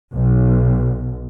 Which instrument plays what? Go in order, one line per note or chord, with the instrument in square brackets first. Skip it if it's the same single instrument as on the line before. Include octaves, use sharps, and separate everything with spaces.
[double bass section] B1